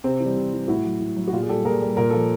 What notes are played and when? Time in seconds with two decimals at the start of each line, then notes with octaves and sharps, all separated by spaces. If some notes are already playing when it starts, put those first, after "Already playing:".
0.04 C3 C4
0.20 E3
0.25 G3
0.36 C3
0.53 E3 G3
0.68 A2 E4 F#4
0.85 F#3
1.00 A2
1.16 F#3
1.28 F#4
1.33 A#2 F4 G4
1.43 G#4
1.49 G3 G4 A4
1.65 A#2 G#4 A#4
1.82 G3
1.97 A#2 A#4
2.10 F3 A4